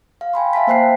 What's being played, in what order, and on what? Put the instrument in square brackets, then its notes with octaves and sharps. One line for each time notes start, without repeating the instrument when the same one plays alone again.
[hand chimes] F5
G5 G#5 B5 C6
E5 F5 A5 B6
A#3 C5 G5 F#6 C7